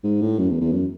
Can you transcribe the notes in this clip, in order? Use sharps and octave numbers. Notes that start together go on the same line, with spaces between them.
G#2
A2
F#2
E2
E2
F#2